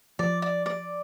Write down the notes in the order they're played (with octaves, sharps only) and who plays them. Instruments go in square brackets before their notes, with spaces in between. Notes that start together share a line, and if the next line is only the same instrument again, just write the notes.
[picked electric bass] F3 [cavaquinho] D5
[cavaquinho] D5
D5